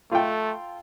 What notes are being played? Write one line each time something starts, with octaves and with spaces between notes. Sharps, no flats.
A3 F4 A4 G5